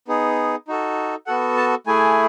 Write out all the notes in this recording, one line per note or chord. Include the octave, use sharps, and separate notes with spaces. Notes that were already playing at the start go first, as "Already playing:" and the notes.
B3 D#4 G#4
D#4 F#4 A4
B3 F#4 A4 F#5
A5
A3 E4 G#4 G#5